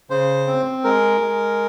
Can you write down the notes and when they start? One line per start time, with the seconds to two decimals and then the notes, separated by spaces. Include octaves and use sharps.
0.10 C#3 C5
0.47 C4
0.84 G#3 A#4
1.21 G#3